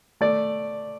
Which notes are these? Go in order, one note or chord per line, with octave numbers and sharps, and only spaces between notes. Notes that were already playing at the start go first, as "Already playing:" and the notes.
A3 D5